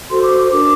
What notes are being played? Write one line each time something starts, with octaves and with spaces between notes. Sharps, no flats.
F#4 A4 C5 C6
D6
D6
D4 F#4 A#4 D6